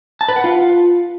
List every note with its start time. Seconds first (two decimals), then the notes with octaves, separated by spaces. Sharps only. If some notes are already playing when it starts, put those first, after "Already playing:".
0.21 A5
0.29 B4
0.36 F#5
0.44 F4